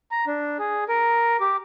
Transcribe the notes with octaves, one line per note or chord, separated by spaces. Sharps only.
A#5
D4
G#4
A#4
G4